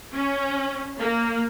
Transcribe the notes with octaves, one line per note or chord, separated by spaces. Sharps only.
C#4
A#3